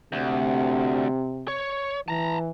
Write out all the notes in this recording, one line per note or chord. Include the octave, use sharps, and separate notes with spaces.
D2 C3
C#5
E3 A5 A#5